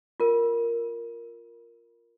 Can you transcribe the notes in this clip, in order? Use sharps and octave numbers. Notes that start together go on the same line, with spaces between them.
F4 A#4